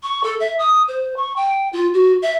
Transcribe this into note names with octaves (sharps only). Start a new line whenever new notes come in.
C#6
A4
E5
D#6
C5
C#6
G5
F4
F#4
E5